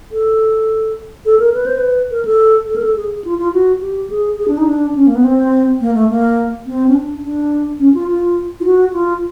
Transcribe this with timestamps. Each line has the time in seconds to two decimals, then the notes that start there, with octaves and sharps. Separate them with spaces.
0.12 A4
1.25 A4
1.39 A#4
1.54 B4
1.66 C5
1.78 B4
2.11 A#4
2.25 A4
2.68 A4
2.76 A#4
2.82 A4
2.96 G#4
3.25 F4
3.39 F4
3.53 F#4
3.81 G4
4.10 G#4
4.39 G#4
4.48 D4
4.58 D#4
4.66 D4
4.95 C#4
5.07 A#3
5.15 B3
5.24 C4
5.81 A#3
5.95 A3
6.09 A#3
6.66 C4
6.88 C#4
6.94 D4
7.23 D4
7.79 C#4
7.94 F4
8.08 F4
8.60 F4
8.65 F#4
8.93 F4